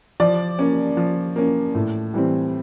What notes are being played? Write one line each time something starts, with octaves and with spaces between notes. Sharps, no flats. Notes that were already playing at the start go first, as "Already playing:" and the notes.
F3 D5
A#3 C#4
F3
A#3 C#4
A2
E3 G3 C4